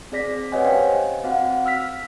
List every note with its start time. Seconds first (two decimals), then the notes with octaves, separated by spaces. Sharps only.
0.12 C4 G#4 D5 A#6 B6
0.52 G4 B4 C#5 D#5 F#5 G#5
0.65 C#4 C5 D#5 F5 G5 G#5
1.24 C4 F#4 F5 F#5
1.66 E6 F6 B6